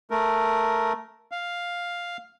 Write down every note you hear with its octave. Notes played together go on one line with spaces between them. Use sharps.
A3 A#4
F5